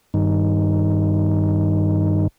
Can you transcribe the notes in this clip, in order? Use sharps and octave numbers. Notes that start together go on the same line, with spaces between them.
G2 D#3